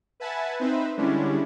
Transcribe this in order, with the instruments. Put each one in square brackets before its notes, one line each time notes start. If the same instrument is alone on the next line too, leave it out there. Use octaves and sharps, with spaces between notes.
[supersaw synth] B4 E5 F#5 G#5 A5
C4 D#4 B4 C5 E5
D3 G3 G#3 C#4 D4 E4